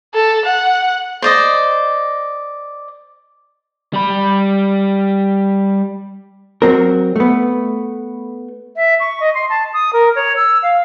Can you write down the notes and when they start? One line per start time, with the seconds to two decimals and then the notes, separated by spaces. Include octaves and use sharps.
0.15 A4
0.45 F#5
1.22 C5 D5 D#5
3.93 G3 B5
6.62 F#3 C4 A#4
7.16 A3 B3
8.76 E5
9.00 C#6
9.20 D#5
9.34 C6
9.50 A5
9.73 D#6
9.93 A#4
10.16 C#5
10.36 E6
10.63 F5